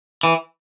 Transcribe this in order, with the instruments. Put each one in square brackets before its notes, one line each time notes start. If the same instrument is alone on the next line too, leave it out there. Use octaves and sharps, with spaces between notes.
[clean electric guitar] E3